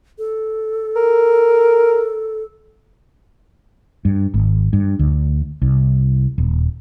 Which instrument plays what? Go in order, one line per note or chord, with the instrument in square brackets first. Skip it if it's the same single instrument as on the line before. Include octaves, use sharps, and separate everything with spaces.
[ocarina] A4
[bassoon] A#4
[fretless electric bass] G2
G#1
G2
D2
C2
D#1